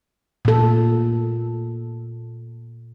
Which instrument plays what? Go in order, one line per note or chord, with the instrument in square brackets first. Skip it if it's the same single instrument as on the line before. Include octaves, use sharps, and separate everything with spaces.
[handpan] A#2 A4